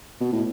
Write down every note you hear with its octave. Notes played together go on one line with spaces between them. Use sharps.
B2
A2